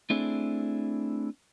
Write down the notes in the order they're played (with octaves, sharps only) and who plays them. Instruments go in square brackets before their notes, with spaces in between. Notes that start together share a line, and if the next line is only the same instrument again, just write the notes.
[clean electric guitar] A3 C4 D4 E4 G#4